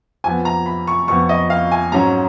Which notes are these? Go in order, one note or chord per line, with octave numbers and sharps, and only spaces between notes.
F2 F3 B3 G#5
A#5
B5
C#6
F2 F3 B3 C#6
D#5
F5
G#5
G#2 F#3 C#4 A#5